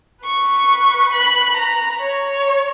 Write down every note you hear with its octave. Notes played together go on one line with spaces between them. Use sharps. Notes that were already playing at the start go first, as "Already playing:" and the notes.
B4 C#6
B5
A#5
C#5